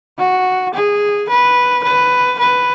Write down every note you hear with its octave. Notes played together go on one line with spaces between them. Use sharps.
F#4
G#4
B4
B4
B4